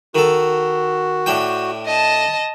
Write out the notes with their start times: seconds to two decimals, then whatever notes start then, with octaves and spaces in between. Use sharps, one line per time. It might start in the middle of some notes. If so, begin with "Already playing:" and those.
0.15 D#3 F#4 A4
1.26 A2 D4 G5
1.86 D#5 A5